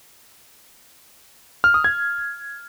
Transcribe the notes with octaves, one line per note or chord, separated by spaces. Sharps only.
F6
D#6
G#6